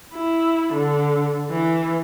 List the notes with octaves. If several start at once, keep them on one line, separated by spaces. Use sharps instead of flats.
E4
D3
E3